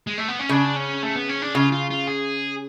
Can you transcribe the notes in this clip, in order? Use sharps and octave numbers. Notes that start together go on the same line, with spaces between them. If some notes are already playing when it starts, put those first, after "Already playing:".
G#3
A3
B3
C#4
C#3 D4
C#4
A3
B3
C#4
D4
C#3 F4
F4
F4
G#4